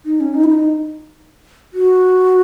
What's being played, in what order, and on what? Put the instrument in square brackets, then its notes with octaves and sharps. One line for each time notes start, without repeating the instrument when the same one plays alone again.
[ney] D#4
C#4
D#4
E4
D#4
F#4